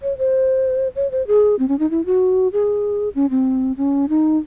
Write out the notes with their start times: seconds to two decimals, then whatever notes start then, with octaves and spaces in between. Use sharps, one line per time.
0.02 C#5
0.18 C5
0.96 C#5
1.11 C5
1.27 G#4
1.59 C4
1.68 C#4
1.79 D#4
1.90 E4
2.06 F#4
2.53 G#4
3.15 C#4
3.30 C4
3.77 C#4
4.09 D#4